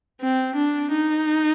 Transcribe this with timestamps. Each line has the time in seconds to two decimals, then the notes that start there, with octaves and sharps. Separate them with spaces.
0.21 C4
0.56 D4
0.91 D#4